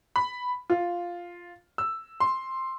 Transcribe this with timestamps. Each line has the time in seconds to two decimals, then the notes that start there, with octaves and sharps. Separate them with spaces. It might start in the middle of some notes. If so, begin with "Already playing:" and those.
0.16 B5
0.70 F4
1.78 E6
2.20 C6